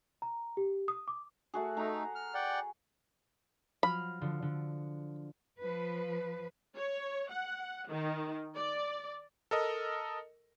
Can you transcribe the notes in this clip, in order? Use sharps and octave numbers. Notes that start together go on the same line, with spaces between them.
A#5
G4
D#6
D6
A3 F#4 G#4
A3 D#4 A#5
F6
D5 F#5 G5
F3 F#3 B5 F6
D3 F3
D3
F3 B4
C#5
F#5
D#3
D5
A4 A#4 D#5